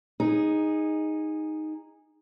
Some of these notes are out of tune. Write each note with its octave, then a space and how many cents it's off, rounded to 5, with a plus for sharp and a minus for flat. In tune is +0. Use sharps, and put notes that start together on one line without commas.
D#4 +0 G#4 -15